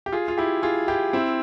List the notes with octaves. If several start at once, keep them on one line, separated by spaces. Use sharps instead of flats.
G4
F4 G#4
F4
E4 G4
F4 G#4
E4 G4
C4 E4